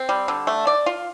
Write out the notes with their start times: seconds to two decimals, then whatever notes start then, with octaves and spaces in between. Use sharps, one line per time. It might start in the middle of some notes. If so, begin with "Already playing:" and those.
Already playing: C4
0.09 G3
0.28 D3
0.47 A3
0.67 D5
0.86 F4